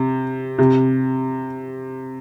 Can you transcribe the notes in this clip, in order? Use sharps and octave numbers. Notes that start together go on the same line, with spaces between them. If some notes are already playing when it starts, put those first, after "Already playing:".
Already playing: C3
C3